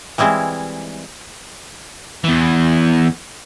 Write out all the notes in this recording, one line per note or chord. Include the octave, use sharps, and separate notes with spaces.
E3 G3 G#3 C4 E4
E2 E3